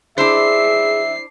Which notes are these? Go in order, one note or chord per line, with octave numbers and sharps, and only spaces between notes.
D4 E4 G#4 C5 E5 C7